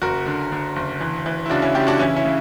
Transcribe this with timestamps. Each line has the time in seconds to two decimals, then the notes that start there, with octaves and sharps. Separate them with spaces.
0.02 F#1 F#4 A#4
0.26 D3
0.52 D3
0.76 F#1
1.01 E3
1.26 E3
1.46 E4
1.50 C#3 D4 F#4
1.62 C#4 E4
1.75 C#3 E4 G4
1.87 D4 F#4
1.99 E3 C#4 E4
2.16 C#4 E4
2.25 C#3